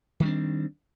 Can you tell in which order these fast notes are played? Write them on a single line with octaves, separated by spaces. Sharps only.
D#3 G3 D4 C4